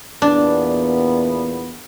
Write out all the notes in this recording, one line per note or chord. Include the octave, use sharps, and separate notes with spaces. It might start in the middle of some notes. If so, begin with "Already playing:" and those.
E2 A#2 B3 D4